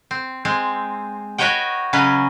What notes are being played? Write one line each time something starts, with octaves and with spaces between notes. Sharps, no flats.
C4
G#3 C4
F#4 B4 C#5 D#5 F#5 G5
C#3 F#3 C#4 B4 D#5